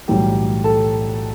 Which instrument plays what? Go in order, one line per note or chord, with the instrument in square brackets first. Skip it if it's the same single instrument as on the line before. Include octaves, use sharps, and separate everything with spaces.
[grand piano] B1 A2 E3 G3 G4 G5
A4 A5